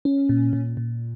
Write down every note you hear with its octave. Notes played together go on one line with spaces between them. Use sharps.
C#4
A#2
A#2
A#2